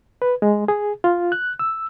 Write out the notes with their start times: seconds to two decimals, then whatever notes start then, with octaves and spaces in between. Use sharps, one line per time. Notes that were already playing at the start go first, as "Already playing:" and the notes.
0.22 B4
0.42 G#3
0.68 G#4
1.04 F4
1.32 F#6
1.59 E6